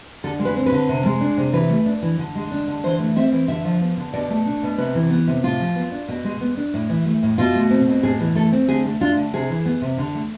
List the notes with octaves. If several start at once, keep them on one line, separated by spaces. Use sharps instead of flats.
D3 A4
G#3
B4
C4
B4
D3
C3
G#3
D4
C3
E3 B4
A3
D4
E3
D3
G#3
D4
D3
E3 C5
A3
C4 E5
E3
D3 E5
F3
B3
D3
B2 D5
A3
D4
B2
C3 B4
E3
B3
C3
A2 F4
F3
B3
D4
B2
G#3
B3
D4
A2
E3
A3
A2
B2 F4
A3
C4
B2
A2 G#4
E3
A3 A4
C4
D3 G#4
A3
D4 F4
D3
C3 G#4
E3
B3
C3
D3
A3